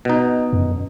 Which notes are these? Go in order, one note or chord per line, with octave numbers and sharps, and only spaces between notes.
B2 D#4
F#2